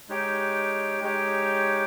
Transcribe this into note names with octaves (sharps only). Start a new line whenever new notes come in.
G#3 D#4 G4 C#5 G5
G#3 D#4 G4 C#5 G5